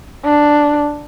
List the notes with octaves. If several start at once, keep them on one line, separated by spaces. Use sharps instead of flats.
D4